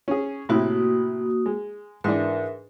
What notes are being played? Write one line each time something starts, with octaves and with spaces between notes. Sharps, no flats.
C#4 G#4
A2 C3 A#3 E4 F#4 D#6
G#3
G#2 E3 D4 A#4 B4 E5